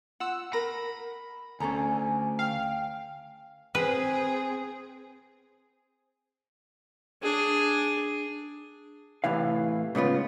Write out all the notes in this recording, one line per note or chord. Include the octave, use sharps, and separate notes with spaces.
F4 F#5 E6
A#4 A#5 B5 A#6
D2 C#4 A4 G#5 A#5
F5 G5
C4 G#4 B4
D4 G#4
A2 C3 E3 F5
G#2 C#3 B3 F4